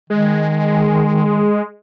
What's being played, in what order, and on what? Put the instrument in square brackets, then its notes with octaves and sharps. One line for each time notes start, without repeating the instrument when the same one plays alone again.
[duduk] D#3 [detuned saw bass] G#3